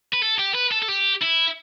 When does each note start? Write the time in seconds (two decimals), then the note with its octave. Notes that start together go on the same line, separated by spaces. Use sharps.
0.13 B4
0.22 A4
0.39 G4
0.54 B4
0.72 A4
0.82 A4
0.88 G4
1.22 E4